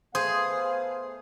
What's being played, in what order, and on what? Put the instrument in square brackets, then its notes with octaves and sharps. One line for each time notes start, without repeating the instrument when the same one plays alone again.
[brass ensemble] A3 B3 F5 [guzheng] G#4 [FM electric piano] C5